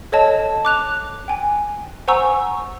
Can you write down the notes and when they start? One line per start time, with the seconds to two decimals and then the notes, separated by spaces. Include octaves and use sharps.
0.12 A4 C#5 D#5 A5
0.65 D6 F#6 F7
1.28 G5 G#5
2.08 C5 F#5 G#5 A#5 C#6 E6